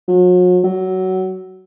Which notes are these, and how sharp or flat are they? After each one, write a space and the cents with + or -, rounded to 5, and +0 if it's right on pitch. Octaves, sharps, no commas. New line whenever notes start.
F#3 -40
F#3 +15